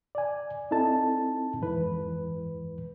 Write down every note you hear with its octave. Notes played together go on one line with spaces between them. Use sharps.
D5 G#5
C4 D#4 E4 A4 A5
F2 G#2 E3 B4